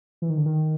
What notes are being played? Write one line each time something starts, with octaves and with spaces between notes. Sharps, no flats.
E3
D#3
D3
D#3